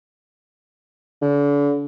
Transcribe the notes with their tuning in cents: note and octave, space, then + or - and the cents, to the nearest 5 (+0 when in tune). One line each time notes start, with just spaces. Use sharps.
D3 -40